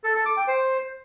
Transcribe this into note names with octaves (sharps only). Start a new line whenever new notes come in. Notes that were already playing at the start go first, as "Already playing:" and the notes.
A4
A4
D6
G5
C5